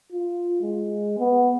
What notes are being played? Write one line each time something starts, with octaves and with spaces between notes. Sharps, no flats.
F4
G#3
B3